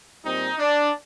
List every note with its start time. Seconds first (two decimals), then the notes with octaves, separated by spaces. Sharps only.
0.25 A#2 G3 C4 D#4
0.59 D4